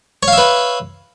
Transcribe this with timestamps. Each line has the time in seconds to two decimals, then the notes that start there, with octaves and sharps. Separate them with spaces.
0.23 C#5
0.28 F5
0.33 E5
0.38 B4